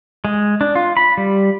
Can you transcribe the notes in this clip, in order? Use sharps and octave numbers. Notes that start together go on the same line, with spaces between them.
G#3
D4
F4
B5
G3